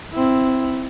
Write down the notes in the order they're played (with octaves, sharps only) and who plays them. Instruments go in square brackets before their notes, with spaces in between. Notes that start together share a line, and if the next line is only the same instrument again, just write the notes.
[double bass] C4 E4